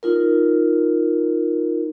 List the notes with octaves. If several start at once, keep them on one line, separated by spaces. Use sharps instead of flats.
D#4 F4 A#4